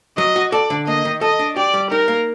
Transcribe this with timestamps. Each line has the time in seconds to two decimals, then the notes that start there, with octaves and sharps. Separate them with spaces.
0.18 F#3 D#5
0.36 F#4
0.52 A4 D5
0.70 D3
0.87 A#3 D#5
1.05 D#3
1.21 A4 D#5
1.39 D4
1.56 G4 D5
1.74 G3
1.91 D#4 A#4
2.08 A#3